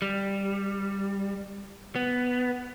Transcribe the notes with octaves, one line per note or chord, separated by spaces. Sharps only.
G3
B3